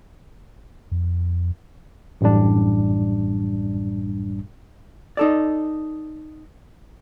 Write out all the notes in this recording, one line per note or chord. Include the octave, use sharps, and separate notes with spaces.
F2
A1 F#2 A2 G3 D4
D#4 A4 D5